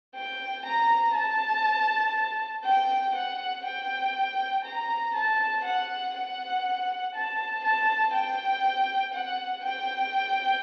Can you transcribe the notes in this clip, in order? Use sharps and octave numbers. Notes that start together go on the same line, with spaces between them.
G5
A#5
A5
G5
F#5
G5
A#5
A5
F#5
F#5
A5
A5
G5
F#5
G5